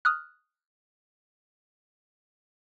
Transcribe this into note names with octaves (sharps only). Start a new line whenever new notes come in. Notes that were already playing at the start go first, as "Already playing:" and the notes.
D#6 F6 F#6